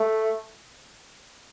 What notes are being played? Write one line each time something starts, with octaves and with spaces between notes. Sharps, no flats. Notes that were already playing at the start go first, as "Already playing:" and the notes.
Already playing: A3